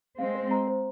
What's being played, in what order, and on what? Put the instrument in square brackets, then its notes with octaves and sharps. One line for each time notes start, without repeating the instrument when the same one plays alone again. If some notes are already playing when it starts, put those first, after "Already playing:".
[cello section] G#3 C4 [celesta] F5
[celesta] C5
A#5
C5